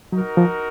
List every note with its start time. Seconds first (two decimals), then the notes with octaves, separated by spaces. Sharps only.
0.12 F#3 D#4 F#4 A#4
0.37 F3